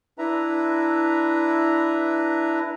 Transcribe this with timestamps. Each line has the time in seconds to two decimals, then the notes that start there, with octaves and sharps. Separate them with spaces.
0.18 D4 E4 B4 E5 A#5